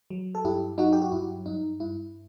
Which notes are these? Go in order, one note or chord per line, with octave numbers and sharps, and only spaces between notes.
F#3
A4
G2 E4 G4
F#3 D#4 F#4
G4
F#4
G2 E4
G2 D#4
G2 E4